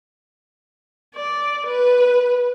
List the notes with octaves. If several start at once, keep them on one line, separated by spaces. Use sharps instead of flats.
D5
B4